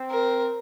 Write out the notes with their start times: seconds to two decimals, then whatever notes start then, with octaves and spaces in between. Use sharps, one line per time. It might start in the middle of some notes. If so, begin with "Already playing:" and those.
Already playing: C4
0.11 A#4